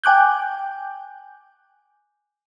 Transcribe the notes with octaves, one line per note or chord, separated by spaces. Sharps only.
G5 G#5 D6 F#6 G6